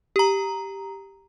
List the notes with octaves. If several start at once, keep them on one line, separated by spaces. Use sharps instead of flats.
G4 A#5